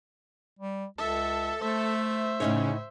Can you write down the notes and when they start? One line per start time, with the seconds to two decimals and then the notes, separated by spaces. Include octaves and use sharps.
0.59 G3
0.98 C#2 A4 E5
1.62 A3 C5 E5
2.40 A2 C#3 C#4 D#4 C#5